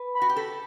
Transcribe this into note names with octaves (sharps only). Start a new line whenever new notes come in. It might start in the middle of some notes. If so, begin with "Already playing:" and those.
Already playing: B4
B5
F#4
G4
A4 B5